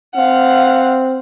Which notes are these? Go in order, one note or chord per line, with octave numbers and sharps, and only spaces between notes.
C4 F5 F#5